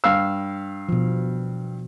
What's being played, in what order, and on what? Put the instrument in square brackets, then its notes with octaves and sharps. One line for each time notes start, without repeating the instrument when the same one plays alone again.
[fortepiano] G2 F5 E6
[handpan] B2 F3